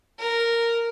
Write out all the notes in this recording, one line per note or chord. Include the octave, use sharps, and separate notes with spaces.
A#4